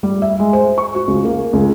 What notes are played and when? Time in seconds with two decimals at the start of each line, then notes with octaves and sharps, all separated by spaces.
0.03 G3
0.22 E5
0.39 G#3
0.53 C5
0.78 C#6
0.95 F#4
1.08 C#2
1.25 A#3
1.53 C#2